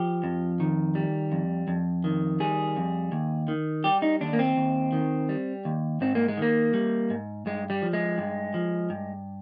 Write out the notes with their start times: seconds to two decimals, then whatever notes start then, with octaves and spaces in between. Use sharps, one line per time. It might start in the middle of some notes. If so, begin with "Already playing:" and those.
Already playing: F3 G4
0.23 F2
0.60 D#3
0.95 G3
1.32 F2
1.68 F2
2.04 D#3
2.40 G3 G#4
2.76 F2
3.12 D#2
3.48 D#3
3.84 G3 G4
4.02 D#4
4.21 D#2 D4
4.33 A#3
4.39 C4
4.57 D#2
4.92 D#3
5.29 G3
5.65 D#2
6.01 G#2 C4
6.15 A#3
6.28 G#3
6.37 D#3 A#3
6.74 G3
7.10 G#2
7.46 G2 G#3
7.70 G3
7.82 F3
7.93 G#3
8.18 G2
8.54 F3
8.90 G2